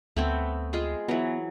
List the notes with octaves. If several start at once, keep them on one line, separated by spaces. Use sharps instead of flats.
D2 A3 B3 C4
G#3 F4 G#4
E3 F#3 B3